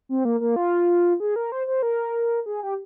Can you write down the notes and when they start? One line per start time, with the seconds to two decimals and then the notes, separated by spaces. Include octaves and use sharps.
0.09 C4
0.25 A#3
0.40 A#3
0.56 F4
1.20 G#4
1.36 A#4
1.52 C5
1.67 C5
1.83 A#4
2.46 G#4
2.63 G4